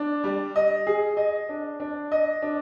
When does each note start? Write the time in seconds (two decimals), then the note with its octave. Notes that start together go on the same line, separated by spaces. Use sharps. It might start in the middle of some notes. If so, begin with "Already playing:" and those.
Already playing: D4
0.24 G3
0.56 D#5
0.87 G#4
1.17 D#5
1.49 D4
1.80 D4
2.12 D#5
2.42 D4